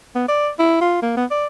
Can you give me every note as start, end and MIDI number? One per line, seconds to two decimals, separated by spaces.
0.15 0.26 59
0.28 0.50 74
0.59 0.79 64
0.81 0.98 65
1.02 1.12 58
1.17 1.25 59
1.31 1.46 74